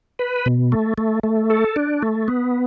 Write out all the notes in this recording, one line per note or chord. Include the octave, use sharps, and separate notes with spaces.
B4
B2
A3
A3
A3
A4
D4
A3
B3